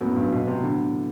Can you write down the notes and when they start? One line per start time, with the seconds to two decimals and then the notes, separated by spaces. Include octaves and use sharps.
0.01 F#2 A2 F#3 B3
0.16 G2
0.32 B2
0.47 C3
0.63 D3